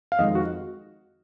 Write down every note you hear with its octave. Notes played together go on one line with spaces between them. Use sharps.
F5
F2 D#3 G#3 D#5
F#4